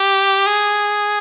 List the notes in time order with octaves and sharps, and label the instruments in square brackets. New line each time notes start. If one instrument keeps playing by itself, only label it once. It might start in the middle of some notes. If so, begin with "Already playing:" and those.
Already playing: [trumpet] G4
G#4